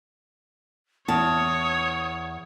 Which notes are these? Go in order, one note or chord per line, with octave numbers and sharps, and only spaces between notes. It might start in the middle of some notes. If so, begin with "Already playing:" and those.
E2 C#5 A5 D#6